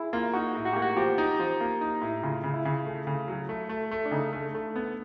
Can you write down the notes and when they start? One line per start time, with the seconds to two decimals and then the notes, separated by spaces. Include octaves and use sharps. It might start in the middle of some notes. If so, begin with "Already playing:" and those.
Already playing: E4 G#4
0.13 A#3 F4
0.34 D#4 F#4
0.55 A2
0.66 F#4
0.73 A#3 G4
0.82 F#4
0.96 F3 G4
1.18 D#4
1.39 F3
1.61 A#3
1.81 D#4
2.01 A2
2.23 C#3 F4
2.44 C#3
2.54 E4
2.65 C#3
2.86 A3
3.07 C#3
3.28 F#3
3.49 A3
3.69 A3
3.91 A3
4.06 D4
4.11 C#3 D#4
4.33 A3
4.55 A3
4.76 B3